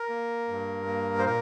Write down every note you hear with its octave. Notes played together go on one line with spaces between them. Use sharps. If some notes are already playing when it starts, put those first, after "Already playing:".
Already playing: A#4
A#3
G2
A#3
C5
A#2 A#4